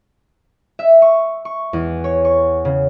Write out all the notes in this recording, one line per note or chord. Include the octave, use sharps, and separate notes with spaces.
E5
C#6
C#6
E2
C#5
C#6
C#3